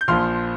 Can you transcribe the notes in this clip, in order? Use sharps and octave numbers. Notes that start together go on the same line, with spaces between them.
G6
A#1 A#2 F3 C6 F6